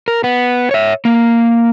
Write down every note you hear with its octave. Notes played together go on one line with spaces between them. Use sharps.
A#4
B3
C#5 E5
A#3